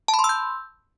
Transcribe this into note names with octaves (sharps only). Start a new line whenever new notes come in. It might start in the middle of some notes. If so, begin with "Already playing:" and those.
A5
B5
C6
E6
G6